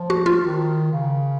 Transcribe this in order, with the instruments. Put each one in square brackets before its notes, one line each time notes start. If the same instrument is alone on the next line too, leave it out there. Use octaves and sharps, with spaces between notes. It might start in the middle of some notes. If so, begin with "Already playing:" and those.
Already playing: [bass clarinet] F3
[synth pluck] F#4
F4
[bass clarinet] D#3
C#3